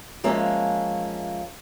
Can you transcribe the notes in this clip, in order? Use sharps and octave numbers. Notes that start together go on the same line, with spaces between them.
F3 G#3 A#3 C#4 E5